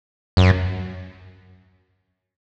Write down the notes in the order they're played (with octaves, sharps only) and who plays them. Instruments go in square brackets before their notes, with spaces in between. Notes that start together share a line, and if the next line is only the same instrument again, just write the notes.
[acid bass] F#2